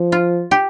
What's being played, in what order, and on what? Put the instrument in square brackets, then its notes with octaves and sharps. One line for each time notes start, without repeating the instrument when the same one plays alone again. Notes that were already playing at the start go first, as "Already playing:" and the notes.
Already playing: [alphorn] F3
[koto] F4
G4